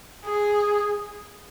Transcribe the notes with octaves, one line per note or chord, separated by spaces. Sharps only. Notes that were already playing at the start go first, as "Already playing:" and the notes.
G#4